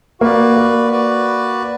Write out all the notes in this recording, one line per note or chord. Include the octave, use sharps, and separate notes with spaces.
A#3 F#4 B4 D5
A#3
F#4 B4 D5